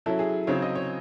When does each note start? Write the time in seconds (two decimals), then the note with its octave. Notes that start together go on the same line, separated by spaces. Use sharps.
0.06 F#3 C#4 E4 A4
0.19 G#4
0.47 C#3 F#3 C4 D#4 C#5
0.62 D#5
0.75 C#5